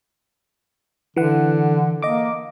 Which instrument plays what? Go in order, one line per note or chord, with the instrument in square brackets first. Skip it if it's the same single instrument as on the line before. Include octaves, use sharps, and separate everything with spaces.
[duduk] D3 [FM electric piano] E3 F#5
[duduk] A#3 [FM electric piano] D#5 D6